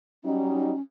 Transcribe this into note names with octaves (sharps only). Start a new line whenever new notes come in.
F#3 G3 C#4 D#4